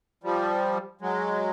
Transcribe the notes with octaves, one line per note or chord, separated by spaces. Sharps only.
F3 G3
F#3 G#3